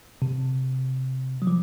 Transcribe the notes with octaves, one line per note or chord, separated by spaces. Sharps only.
C3
F#3
F3